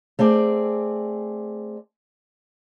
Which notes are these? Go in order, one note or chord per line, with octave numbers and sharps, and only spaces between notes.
A3 C4 G#4 D5